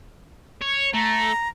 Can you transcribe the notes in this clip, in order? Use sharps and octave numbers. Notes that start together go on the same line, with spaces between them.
C#5
A3 A#5